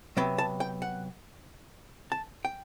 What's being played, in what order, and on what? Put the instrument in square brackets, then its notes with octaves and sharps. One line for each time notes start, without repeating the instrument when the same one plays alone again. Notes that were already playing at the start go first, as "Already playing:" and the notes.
[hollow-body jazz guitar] C3 F#3 B3 G5
A5
G5
F#5
A5
G5